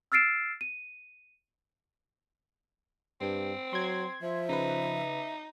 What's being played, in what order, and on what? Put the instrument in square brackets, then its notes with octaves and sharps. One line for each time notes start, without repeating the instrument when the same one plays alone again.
[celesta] E6 F6 A6 C7 D7 E7
D#7
[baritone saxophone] G2 [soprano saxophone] C4
[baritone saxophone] F#3 [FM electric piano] C6 G#6
[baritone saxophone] F3 [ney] E5
[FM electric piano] C#3 B4 [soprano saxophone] D#4